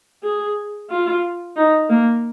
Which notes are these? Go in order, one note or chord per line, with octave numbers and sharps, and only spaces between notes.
G#4
F4
D#4
A#3